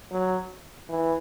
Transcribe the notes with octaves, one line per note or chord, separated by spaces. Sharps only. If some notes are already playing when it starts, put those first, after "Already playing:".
F#3
E3